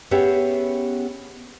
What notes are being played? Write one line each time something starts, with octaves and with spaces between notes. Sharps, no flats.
B3 C#4 G4 G#4 E5